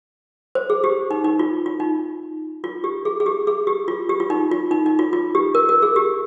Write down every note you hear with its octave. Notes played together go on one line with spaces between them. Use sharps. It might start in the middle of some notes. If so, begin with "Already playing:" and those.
C5
G#4
G4
D#4
D#4
F4
F4
D#4
F4
G4
G#4
G#4
G4
G#4
G4
F4
G4
F4
D#4
F4
D#4
D#4
F4
F4
G4
A#4
A#4
G#4
G4